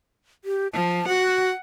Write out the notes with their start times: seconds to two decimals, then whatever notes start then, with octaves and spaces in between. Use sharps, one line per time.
0.45 G4
0.73 F3 A5
1.08 F#4 F#5